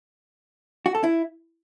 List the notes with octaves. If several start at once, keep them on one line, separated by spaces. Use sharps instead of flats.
F#4
A4
E4